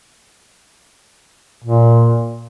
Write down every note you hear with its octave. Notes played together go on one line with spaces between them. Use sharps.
A#2